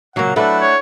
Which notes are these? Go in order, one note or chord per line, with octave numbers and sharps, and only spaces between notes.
A#2 C#3 F#3 A#3 F#5
F#3 A3 D4 E4 A4 B4 F#5
C#5